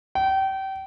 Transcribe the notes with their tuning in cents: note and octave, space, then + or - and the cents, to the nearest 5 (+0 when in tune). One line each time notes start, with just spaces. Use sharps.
G5 -30